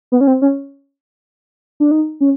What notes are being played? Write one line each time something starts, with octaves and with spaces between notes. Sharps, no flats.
B3
C#4
C4
C#4
D4
D#4
C#4